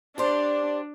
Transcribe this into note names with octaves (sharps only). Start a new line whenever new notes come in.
D4 G4 C5 D5